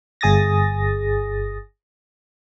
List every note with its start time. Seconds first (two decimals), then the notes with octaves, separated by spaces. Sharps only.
0.21 G1 G#4 D#6 A6 A#6